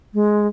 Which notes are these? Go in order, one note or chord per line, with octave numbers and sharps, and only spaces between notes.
G#3